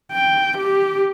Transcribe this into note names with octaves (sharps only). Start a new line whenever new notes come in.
G5
G4